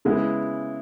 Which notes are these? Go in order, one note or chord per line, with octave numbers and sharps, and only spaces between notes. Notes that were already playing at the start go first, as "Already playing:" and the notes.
C#3 G#3 B3 E4